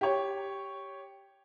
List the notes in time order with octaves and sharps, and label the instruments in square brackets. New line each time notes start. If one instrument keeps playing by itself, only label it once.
[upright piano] G4 C#5